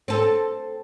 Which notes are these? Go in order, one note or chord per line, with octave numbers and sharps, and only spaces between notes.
C4 A4